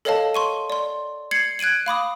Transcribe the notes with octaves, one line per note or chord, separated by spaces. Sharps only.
A4 A#4 C#5 D#5 F5 A5
C6 C#6 D#7
D5 C6
G#6 C7 C#7 F#7
F#6 G#6 D7 D#7 F#7
F5 B5 D6 D#6